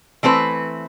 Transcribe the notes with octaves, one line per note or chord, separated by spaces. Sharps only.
E3 A3 C4 B4